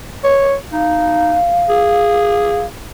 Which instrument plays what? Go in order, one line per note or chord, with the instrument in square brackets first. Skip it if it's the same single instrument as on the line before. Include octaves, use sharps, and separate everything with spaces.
[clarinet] C#5
[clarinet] D#4 [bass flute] F5
[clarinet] G#4